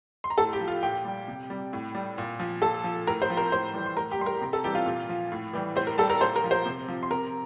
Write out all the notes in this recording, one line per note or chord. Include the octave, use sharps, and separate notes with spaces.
C6
A#5
A2 A4 A5
G4 G5
F3
F4 F5
A#2 G4 G5
G3
C3
G3
A2
G3
A#2
F3
A#2 A4 A5
F3
A2 A#4 A#5
C5 C6
F3
A#4 A#5
A2 C5 C6
E3 G3
C6
A2 A#4 A#5
G4 G5
G3 C6
A#4 A#5
C3 A#5
A4 A5
E3 G3 G4 G5
F4 F5
A#2
F3
A2
E3 G3
A2 C5
A#4
G3 A4 A5
A#4 A#5
A#2 C5 C6
A#4 A#5
F3
C5 C6
C3
F3
C6
C3 A#4 A#5